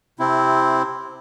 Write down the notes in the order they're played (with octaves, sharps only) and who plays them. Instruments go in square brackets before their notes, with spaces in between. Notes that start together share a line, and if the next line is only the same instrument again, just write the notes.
[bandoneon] C3 C4 E4